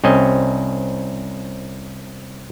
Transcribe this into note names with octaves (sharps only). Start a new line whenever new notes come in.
C2 C4 C#4 D#5